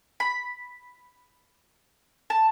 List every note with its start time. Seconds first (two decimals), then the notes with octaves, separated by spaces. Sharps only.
0.20 B5
2.30 A5